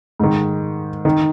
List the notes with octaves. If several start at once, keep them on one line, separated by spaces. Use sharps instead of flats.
G#2 D#3
D#3